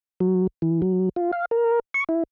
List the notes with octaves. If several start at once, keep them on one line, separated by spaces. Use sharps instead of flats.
F#3
E3
F#3
F4
F5
A#4
C#6
E4